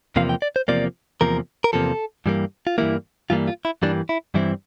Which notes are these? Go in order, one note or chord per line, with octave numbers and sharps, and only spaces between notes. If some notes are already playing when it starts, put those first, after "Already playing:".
E2 C3 F3 A#3 F5
G5
D5
C5
E2 C3 F3 A#3 D5
E2 C3 F3 A#3 A#4
A#4
E2 C3 F3 A#3 A4
G2 E3 G3 A#3
F4
G2 E3 G3 A#3 E4
G2 E3 G3 A#3 F4
F4
E4
G2 E3 G3 A#3 D4
E4
G2 E3 G3 C4 E4